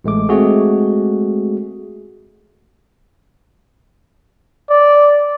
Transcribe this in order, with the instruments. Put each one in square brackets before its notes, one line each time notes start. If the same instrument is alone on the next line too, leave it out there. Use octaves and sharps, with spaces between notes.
[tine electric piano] A1 G#3 A3 D6
G#3 A3 C4 F#4 G#4
[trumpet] D5